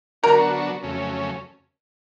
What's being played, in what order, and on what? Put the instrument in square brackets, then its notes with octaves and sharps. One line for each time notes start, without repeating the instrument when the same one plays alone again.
[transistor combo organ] D3 F#3 B3 D4 F#4 [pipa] A#4
[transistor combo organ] F2 C#3 F#3 A3 C#4